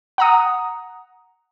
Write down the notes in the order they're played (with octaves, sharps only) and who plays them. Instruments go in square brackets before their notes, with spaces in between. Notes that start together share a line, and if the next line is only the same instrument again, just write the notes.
[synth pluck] F#5 A#5 D#6